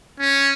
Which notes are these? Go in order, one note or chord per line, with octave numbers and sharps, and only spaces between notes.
C#4